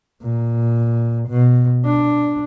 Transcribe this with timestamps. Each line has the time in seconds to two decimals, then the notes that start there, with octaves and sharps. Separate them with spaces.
0.22 A#2
1.29 B2
1.85 D4